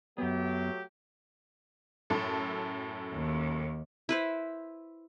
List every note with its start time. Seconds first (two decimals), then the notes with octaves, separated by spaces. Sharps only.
0.18 F#2 F#3 A3 B3 G4
2.10 F#2 A2 A4
3.14 D#2
4.09 E4 B4 C5